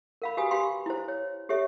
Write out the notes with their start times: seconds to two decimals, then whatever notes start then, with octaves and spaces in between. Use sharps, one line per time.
0.22 A#4 F5 B5
0.37 F#4 G4 B4 F5 G#5 D#6
0.51 G4 F5 G5 B5 C6
0.86 E4 C5
1.08 C#5
1.49 G4 A4 C#5 E5